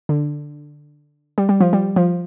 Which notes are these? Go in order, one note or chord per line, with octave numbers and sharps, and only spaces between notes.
D3
G3
G3
F3
G3
F3